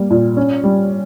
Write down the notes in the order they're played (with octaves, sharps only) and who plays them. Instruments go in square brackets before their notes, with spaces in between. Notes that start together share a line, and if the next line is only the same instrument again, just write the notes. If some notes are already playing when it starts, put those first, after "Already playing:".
Already playing: [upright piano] G3 A#3
A#2
C#4
G3